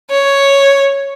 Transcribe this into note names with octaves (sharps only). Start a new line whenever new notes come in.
C#5